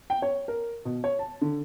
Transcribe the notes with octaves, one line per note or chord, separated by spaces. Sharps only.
G5
C#5
A#4
B2
C#5
A5
D3